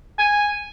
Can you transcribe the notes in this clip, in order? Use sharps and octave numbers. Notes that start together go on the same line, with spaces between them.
G#5